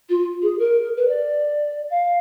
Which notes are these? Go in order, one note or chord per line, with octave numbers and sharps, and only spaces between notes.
F4
G#4
A#4
B4
D5
F5